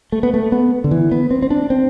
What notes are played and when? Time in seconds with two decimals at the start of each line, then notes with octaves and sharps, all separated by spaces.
0.12 A3
0.23 B3
0.34 A3
0.52 B3
0.84 D3
0.91 E3
1.12 B3
1.31 C4
1.42 C4
1.50 D4
1.70 C4